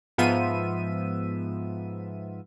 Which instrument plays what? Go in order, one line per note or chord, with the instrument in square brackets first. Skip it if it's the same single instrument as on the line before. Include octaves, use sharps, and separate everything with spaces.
[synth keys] G#2 F3 B3 F4 E5 D#7